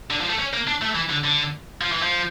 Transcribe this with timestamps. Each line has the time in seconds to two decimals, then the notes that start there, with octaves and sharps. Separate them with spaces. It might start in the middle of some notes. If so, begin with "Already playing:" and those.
0.11 D3
0.21 F3
0.30 A3
0.39 C#4
0.54 A#3
0.68 D4
0.82 A3
0.95 E3
1.10 D3
1.25 D3
1.81 F3
1.92 E3
2.01 F3